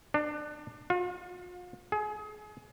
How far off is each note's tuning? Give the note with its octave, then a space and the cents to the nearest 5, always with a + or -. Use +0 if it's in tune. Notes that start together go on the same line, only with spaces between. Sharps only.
D4 +25
F4 +40
G#4 +30